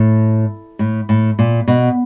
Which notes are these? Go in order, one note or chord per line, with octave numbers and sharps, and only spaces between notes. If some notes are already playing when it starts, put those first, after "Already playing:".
Already playing: A2
A2
A2
A#2
B2